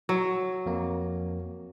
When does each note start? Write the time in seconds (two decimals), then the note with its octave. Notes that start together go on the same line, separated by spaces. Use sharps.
0.09 F#3
0.66 F2 A#3